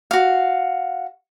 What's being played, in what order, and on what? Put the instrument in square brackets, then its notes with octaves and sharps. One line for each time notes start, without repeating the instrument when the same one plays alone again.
[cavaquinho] F#4 F5